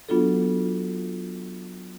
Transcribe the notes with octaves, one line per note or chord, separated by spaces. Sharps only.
F#3 B3 D4 F4 F#4 A4